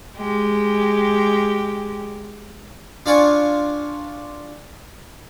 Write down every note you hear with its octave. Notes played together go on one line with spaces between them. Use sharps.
G#3 G4
D4 F4 D5 G#5 C#6